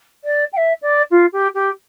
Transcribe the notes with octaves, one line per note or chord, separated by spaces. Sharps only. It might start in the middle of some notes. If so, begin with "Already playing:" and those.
D5
G5
E5
D5
F4
G4
G4